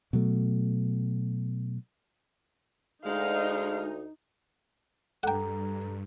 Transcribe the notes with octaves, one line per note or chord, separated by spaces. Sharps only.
B2 F#3 A3
D2 G#3 D#4 F5
G2 A4 F#5 G5 A#5